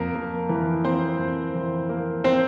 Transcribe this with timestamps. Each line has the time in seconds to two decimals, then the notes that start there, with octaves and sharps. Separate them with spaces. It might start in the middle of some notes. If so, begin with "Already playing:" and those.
Already playing: F2 A#3 A#4
0.15 A#3
0.49 E3
0.84 A#3 C4 C5
1.19 F2
1.55 E3
1.89 A#3
2.24 C4 C5